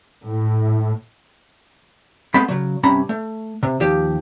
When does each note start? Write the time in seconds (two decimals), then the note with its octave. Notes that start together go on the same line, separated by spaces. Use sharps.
0.25 A2
2.34 G#3 A3 B3 C4 B5
2.48 C#3 F#3
2.83 G2 C3 C#4 A#5 B5
3.09 A3
3.63 C3
3.80 D#2 F3 G4